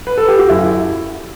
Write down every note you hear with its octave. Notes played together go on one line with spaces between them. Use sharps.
B4
A4
G4
F#4
F#2 E4